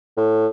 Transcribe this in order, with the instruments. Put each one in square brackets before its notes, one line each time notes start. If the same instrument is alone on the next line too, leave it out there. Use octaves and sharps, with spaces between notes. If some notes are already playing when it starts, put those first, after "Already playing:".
[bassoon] A2